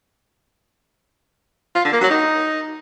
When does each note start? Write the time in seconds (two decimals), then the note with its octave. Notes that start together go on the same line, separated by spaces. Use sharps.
1.76 F4
1.84 D3
1.93 A#3
2.01 F#3
2.10 D#4